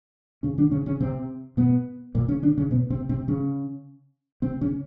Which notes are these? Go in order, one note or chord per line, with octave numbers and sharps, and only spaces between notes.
C#3 C#4
D3 D4
C#3 C#4
C#3 C#4
C3 C4
B2 B3
A#2 A#3
C#3 C#4
D3 D4
C#3 C#4
B2 B3
C3 C4
C3 C4
C#3 C#4
C3 C4
C#3 C#4